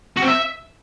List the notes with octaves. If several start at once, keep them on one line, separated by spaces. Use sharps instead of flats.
F#4
C4
E5